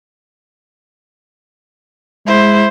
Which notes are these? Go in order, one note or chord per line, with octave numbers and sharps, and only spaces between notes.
G#3 E4 C5